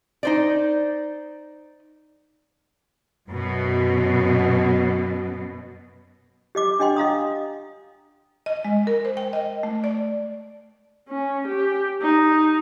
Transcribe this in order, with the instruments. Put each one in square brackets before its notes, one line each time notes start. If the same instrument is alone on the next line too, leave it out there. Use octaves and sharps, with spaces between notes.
[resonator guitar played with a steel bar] D#4 C5 D5
[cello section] F#2 B2
[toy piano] G4 D#5 D6
D4 G4 D#5 G5 C6
D#5 F5 A#5 D#6
[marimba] D#5
G#3
A#4
C5
G5
D#5
A3
D5
[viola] C#4
G4
D#4